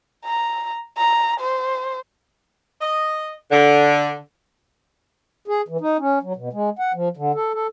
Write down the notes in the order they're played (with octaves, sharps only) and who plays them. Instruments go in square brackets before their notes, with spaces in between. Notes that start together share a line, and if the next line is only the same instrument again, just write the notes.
[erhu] A#5
A#5
C5
[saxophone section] D#5
D3
[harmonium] G#4
E3
D#4
C#4
F#3
B2
G#3
F#5
F3
D3
A4
A4